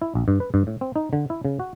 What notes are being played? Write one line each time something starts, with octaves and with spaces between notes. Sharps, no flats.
E4
A#1
G2
B4
G2
A2
C4
D#4
D3
E4
C#3
F#4